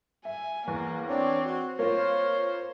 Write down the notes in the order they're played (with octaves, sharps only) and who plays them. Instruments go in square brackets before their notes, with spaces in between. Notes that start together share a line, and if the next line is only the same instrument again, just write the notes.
[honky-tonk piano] E5 [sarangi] G#5
[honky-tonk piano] E2 [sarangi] A#3
[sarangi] C4 [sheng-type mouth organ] D4 C#5
[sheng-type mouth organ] F#4
[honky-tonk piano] A#3 F4 [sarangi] C5 [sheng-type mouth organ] C#5